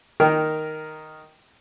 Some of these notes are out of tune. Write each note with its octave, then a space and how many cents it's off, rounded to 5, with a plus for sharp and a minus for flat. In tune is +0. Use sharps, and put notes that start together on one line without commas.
D#3 +0 A#4 +0 G5 +0